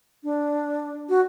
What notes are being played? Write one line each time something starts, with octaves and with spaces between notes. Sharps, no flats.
D4
F#4